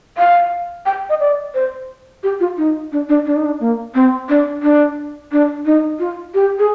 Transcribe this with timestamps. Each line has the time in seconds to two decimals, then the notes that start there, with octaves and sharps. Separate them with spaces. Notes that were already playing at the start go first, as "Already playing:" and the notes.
0.18 F5
0.86 G5
1.09 D#5
1.20 D5
1.55 C5
2.23 G4
2.40 F4
2.57 D#4
2.92 D4
3.09 D4
3.26 D4
3.36 D#4
3.46 D4
3.60 A#3
3.95 C4
4.29 D4
4.63 D4
5.32 D4
5.66 D#4
5.99 F4
6.34 G4
6.59 G#4